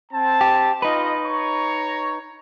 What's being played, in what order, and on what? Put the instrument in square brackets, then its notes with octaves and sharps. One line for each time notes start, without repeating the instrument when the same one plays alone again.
[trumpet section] C4 A5
[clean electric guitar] G4
[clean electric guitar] D#4 B4 [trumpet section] F4 D#5
[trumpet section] C#5 A#5 C#6